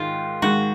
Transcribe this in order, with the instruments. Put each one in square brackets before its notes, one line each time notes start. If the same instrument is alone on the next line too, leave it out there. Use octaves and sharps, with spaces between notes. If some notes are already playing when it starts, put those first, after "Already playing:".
Already playing: [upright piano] G#2 D#3 G#3 [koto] F4
[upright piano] G#2 D#3 G#3 [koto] F#4